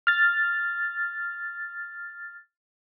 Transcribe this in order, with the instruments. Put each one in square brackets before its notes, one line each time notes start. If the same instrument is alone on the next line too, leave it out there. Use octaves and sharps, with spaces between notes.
[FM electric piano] F6 A6